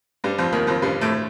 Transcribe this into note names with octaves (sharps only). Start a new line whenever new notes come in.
G2 G3
F2 F3
D#2 D#3
F2 F3
G2 G3
A2 A3